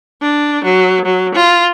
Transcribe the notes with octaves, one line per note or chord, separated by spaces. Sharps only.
D4
F#3
F#3
F4